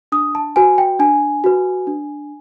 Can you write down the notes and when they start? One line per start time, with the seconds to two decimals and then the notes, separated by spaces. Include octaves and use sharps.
0.12 D4 D#6
0.35 A5
0.56 F#4 B4 G#5
0.78 G5
0.99 D4 G#5
1.44 F#4 B4
1.87 D4